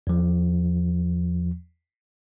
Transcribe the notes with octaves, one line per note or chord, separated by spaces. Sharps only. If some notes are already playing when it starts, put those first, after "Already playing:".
E2 F3